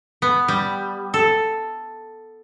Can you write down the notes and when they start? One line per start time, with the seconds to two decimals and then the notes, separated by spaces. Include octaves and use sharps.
0.22 B3
0.48 G3
1.14 A4